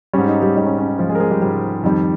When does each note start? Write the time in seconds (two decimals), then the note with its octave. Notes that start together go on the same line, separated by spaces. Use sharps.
0.13 G#2 G3 C#4
0.28 D#4
0.42 G3 G4
0.56 G#2 G3 D#4
0.67 C#4
0.78 C#4
0.88 D#4
0.98 G#2 F3 F4
1.03 G3
1.09 G#3 G#4
1.15 A#4
1.20 G#3 G#4
1.31 G3 G4
1.42 G#2 G3
1.83 F2 D#3 G3